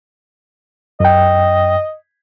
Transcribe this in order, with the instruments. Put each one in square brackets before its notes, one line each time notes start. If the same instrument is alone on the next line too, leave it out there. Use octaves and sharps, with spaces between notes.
[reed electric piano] F#2 G5 [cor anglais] D#5